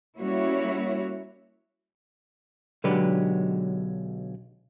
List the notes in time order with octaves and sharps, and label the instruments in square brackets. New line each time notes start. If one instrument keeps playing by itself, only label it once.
[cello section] G3 A#3 C#4 E4 F#4 C#5
[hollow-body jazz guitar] B1 D3 F#3 G#3 G4 B4